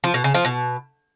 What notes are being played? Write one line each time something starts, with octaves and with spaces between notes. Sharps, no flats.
F3
B2
C#3
F3
B2